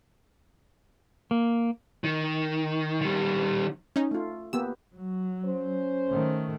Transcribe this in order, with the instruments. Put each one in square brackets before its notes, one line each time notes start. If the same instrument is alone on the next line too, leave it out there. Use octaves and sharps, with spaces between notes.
[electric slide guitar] A#3
[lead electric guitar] D#3
D#3 G3
[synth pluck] C#4 D#4
[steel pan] A3 F4
[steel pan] A#3 B3 G4 [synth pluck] E6
[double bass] F#3
[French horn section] C#4 C5
[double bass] D#3 A3